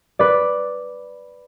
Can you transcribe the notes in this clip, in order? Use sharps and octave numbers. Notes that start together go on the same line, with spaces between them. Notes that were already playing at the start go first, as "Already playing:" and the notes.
B4 D5